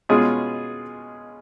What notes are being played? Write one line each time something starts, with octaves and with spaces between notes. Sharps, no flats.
B2 G#3 C#4 F4 G#4